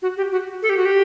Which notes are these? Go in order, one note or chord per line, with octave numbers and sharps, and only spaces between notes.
F#4
G4
F#4
A4
G4
F#4
G4